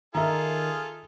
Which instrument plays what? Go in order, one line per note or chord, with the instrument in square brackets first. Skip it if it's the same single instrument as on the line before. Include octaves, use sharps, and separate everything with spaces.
[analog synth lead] D#3 [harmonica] F4 G#4 A4 [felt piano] E5 A#5